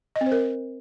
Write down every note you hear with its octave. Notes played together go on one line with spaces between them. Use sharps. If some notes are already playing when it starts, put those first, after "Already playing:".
D#5
C4
C5
A#4